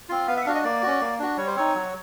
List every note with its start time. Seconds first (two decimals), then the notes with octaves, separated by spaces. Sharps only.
0.09 C4 F4
0.27 B3 F5
0.37 E5
0.42 F#5
0.46 D4 F5
0.49 F#4
0.55 D#5
0.64 A#3 D5
0.83 C#4 F#4
1.01 A#3
1.19 D4 F#4
1.37 G3 C#5
1.47 C5
1.56 C4 D#4 C#5
1.74 F#3